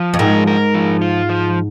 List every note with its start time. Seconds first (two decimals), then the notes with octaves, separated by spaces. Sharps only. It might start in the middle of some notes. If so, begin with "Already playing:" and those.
Already playing: F3
0.14 F2
0.19 G#2 A#4
0.47 A#4
0.74 F3
1.01 F4
1.29 F3